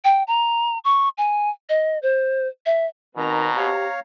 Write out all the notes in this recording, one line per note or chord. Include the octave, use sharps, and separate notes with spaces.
G5
A#5
C#6
G#5
D#5
C5
E5
B2 D#3 C4 A#5
G4 C#5 F5